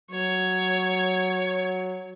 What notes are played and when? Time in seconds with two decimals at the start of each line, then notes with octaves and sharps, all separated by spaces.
0.11 F#3 C#5